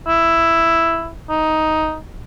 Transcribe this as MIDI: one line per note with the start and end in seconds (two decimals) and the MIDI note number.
0.07 1.12 64
1.30 1.97 63